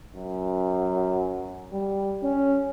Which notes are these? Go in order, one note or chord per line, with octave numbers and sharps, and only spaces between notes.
F#2
G3
C#4